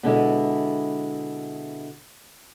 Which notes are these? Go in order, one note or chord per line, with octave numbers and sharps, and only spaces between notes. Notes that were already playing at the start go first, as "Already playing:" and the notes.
B2 D3 G#3 E4